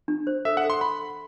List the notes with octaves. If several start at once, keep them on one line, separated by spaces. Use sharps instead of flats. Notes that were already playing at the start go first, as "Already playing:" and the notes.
D4
C5
A4 E5
F#5
A4
C6
B5 C6
C6